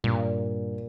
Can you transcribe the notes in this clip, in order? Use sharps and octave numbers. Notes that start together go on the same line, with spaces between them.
G2 A#2